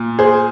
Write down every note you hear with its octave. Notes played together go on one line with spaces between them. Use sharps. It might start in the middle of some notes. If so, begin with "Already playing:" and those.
Already playing: A#2
G#4 C5